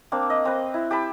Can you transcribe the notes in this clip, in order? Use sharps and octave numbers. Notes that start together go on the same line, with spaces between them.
A#3 C4 D4
D#5
C4 B4
E4
G4 A5 B5